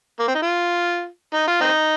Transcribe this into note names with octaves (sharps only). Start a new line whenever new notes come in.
A#3
C4
D#4
F4
D#4
F4
C4 D#4